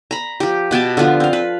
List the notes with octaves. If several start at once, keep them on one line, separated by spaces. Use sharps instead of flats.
A#5 B5
F3 G4
B2 B3 G5 A5
D3 F3 B3 F4
C4 F5
B4